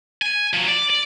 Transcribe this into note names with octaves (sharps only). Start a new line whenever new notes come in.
G#5
F3 F#3
D5
D5